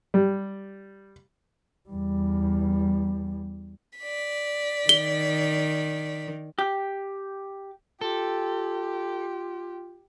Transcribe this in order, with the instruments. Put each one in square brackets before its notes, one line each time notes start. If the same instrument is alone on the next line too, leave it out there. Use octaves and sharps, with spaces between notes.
[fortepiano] G3
[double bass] E2 G3
[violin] D5 B6
[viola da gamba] D#3 [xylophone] G7
[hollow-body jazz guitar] G4
[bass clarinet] F4 [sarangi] G4 [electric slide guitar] A4